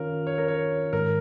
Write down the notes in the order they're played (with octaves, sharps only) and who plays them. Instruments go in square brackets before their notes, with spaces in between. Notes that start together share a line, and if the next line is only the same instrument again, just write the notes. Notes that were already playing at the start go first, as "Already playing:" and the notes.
Already playing: [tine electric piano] D#3 C#4 F4 C#5 F5 [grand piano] A#4
[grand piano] C#5
A#4
C#5
[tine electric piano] G#2 D#3 G#3 [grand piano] A#4